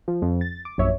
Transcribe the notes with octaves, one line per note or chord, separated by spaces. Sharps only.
F3
F2
A6
D6
A#1 F#2 C#5 E5